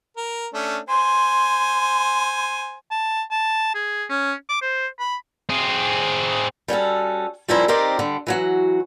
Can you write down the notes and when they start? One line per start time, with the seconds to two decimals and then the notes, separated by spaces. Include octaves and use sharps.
0.17 A#4
0.54 A3 C#4 D4
0.89 C5 G#5 C6
2.91 A5
3.31 A5
3.75 G#4
4.09 C#4
4.49 D6
4.62 C5
4.99 B5
5.49 C4 G#4
6.68 G3 C#4 F#4 A4
7.48 F3 G3 C#4 E4 A#4 C5
7.68 C4 D#4 G4 A#4 C5 D5
7.99 D3 G3
8.27 E3 F#3 F#4